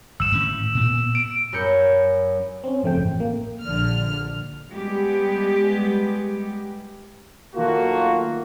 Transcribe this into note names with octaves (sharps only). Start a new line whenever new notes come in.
G1 E6 E7
A2 D#3 C#4
A#2 B3
D7
F#2 A#4 B5 G6 C#7
C4 C#4
G1 F2 C#3 A3 C4 G5
A1
A#3
A#1 D3 F6
G3 G#3 B3 G4
B1 D#3 A3 A#3 F4 F#4